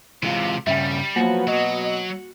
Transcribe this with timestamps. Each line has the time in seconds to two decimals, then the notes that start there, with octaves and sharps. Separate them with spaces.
0.23 C3 E3 G#3 F4
0.67 G2 C#3 G3 C#4 E5 G5
1.16 F3 F#3 A#3 B3 F#4
1.47 B2 F#3 D#5